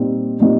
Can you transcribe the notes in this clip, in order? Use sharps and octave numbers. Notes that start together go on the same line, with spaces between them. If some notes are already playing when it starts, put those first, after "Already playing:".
Already playing: A#2 G3 C4 D#4
A#2 G3 C4 D#4